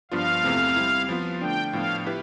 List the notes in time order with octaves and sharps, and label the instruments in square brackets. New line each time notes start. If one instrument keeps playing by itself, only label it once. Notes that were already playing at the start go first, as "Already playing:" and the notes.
[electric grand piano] G2 F3 B3 D4 F4 [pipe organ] F5
[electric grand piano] E2 C3 E3 A3 C4
G3 C4 E4
F3 B3 F4
[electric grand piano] D3 A3 D4 [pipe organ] G5
[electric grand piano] A2 F3 B3 D4 [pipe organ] F5
[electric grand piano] E4 G4 B4